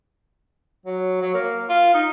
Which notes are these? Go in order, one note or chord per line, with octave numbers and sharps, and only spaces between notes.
F#3
F#3
A#3
F4
D#4